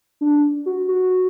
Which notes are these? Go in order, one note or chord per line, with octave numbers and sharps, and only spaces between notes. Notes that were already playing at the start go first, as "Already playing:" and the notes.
D4
F#4
F#4